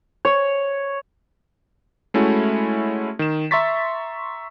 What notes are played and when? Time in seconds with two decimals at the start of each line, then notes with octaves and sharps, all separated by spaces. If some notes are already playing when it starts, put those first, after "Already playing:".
0.25 C#5
2.14 G#3 A3 C#4 E4 F#4
3.19 D#3 E7
3.51 E5 A#5 C6 C#6 A6 B6